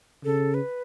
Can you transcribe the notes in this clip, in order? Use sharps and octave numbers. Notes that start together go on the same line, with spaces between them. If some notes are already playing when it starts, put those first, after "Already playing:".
C#3 A4
B4